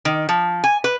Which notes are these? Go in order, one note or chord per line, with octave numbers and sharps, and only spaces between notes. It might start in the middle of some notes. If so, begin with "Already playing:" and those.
D#3
F3
G#5
B4